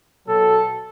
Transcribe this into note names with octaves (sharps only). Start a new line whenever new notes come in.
B2 F#3 A4